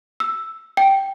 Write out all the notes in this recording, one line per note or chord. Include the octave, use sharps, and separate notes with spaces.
E6
G5